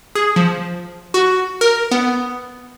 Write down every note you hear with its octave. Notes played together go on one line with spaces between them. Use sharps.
G#4
F3
F#4
A#4
B3